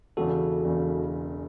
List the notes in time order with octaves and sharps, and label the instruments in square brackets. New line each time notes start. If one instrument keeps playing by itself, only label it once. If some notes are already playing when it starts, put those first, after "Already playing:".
[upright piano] E1 E2 C#3 [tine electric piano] F#4 A4
[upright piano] E1 E2 C#3